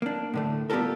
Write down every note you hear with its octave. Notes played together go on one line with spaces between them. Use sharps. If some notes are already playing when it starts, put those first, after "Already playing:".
A#3 D4
A2 D3 A3
G3 B3 F4 G4 A4 A#4